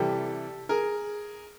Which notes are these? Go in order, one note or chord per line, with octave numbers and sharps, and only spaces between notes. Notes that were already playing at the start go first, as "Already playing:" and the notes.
Already playing: C3 E3 G3 G4 A4
G#4 A#4